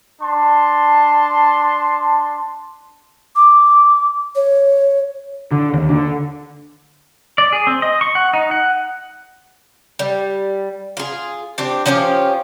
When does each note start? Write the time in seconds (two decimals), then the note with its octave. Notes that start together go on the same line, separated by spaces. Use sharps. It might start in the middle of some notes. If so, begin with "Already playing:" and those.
0.20 D4 A5 C6
3.36 D6
4.35 C#5
5.51 D3
5.73 D#2
5.89 D3
7.38 D5
7.52 G#4
7.67 C4
7.82 D#5
8.01 C#6
8.15 F#5
8.33 D#4
8.51 F#5
9.99 G3
10.97 F4 G#4
11.58 C4 D4 G4
11.86 F3 C#4 F4 G4